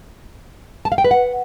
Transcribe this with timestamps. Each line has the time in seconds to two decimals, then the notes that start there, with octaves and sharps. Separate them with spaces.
0.85 A5
0.92 F5
0.98 G5
1.04 B4
1.11 F#5